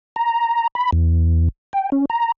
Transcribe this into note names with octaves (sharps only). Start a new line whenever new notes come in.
A#5
B5
E2
G5
C#4
A#5